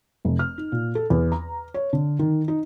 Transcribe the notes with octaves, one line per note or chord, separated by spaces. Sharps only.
F1
F6
D#4
A#2
A4
E2
A#5
C#5
D3
D#3
D#4